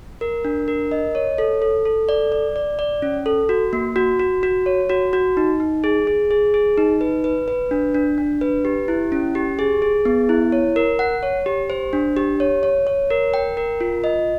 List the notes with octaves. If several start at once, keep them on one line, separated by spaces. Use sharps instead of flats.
A#4
D4
A#4
D#5
C#5
A4
A4
A4
D5
D5
D5
D5
C#4
A4
F#4
A#3
F#4
F#4
F#4
C#5
F#4
F#4
D#4
D#4
G#4
G#4
G#4
G#4
D#4
B4
B4
B4
D4
D4
D4
B4
G4
E4
C#4
G4
G#4
G#4
B3
E4
C#5
A#4
F#5
C#5
G4
C5
D4
G4
C#5
C#5
C#5
A#4
G5
A#4
F4
D#5